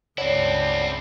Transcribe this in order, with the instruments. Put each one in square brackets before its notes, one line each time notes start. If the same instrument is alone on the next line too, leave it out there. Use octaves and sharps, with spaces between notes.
[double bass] C#2 G2 [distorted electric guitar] C4 E4 [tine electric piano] C#5 [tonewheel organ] D5 F#5 A5